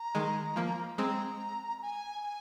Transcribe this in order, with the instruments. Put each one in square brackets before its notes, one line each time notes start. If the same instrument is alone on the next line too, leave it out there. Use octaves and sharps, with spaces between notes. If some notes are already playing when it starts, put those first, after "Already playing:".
Already playing: [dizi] A#5
[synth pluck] D#3 G#3
F3 A#3
[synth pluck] G#3 C4 [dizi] A#5
[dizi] G#5
G#5